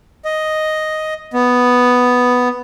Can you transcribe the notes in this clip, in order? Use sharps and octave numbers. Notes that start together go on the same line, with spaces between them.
D#5
B3